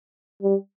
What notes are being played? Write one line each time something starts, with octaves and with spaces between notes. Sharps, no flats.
G3